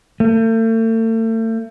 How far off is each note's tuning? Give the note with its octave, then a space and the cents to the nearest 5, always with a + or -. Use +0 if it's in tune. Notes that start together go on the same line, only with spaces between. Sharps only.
A3 +40